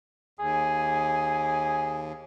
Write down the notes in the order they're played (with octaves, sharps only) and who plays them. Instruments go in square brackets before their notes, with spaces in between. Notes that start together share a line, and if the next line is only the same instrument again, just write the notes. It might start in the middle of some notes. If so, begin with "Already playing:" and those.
[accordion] D#2 [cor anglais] G#4